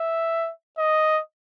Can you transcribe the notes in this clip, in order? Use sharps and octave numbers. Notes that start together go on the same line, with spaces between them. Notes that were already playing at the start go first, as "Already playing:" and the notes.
Already playing: E5
D#5